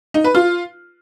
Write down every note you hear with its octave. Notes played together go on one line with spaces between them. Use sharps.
D#4
B4
F4